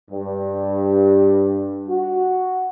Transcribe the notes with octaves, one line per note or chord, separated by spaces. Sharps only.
G2
F#4